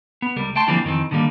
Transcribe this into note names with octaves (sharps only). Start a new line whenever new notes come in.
B3
C#2 G3 A#4
A3 G5 A5 C6
D3 E3 F3 G3 A#3 C4
F2 D#3 E3 C4
D3 D#3 F#3 G3 A#3